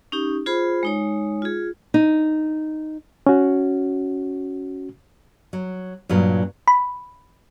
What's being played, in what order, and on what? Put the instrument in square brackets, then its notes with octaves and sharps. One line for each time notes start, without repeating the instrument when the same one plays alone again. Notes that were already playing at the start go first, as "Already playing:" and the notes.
[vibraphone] C#4 D#4 G4
F4 G#4 C5 B5
G#3 D#4 C#5
F4 G#4
[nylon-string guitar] D#4
[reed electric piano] C#4 F#4
[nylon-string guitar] F#3
G2 A#2 F#3
[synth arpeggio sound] B5